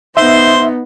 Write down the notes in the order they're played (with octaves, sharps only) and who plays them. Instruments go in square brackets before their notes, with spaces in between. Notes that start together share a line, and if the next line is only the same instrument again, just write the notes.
[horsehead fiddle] B3 D#4 [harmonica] C5 C6 [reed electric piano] E5